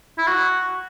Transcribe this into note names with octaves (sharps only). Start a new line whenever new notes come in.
E4
F#4